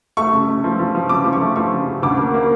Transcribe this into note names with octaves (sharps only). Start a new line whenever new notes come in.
A3 C#6
C#3
A3
F3
F3
F3
C#3 D6
F3
C#6
A3
F3 C#6
C#3
C#3
D2 D6
A#3
A#3